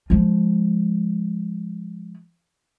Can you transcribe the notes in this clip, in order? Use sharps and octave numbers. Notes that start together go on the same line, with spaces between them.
F3 G#3